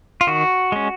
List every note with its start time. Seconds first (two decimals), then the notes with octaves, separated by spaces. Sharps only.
0.21 F4
0.27 D#3 F#4
0.72 G#3 C#4